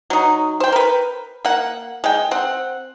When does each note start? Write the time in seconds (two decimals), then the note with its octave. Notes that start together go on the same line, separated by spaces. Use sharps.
0.10 F#3 D#4
0.60 C5 G5
0.72 A#4 B4
1.45 A#3 F#5
2.04 G#3 G5
2.31 C4 F#5